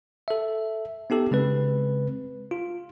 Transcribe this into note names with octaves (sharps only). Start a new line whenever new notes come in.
A4 E5
B3 D#4 G4 A4
C#3 G#3 C4 B4
F4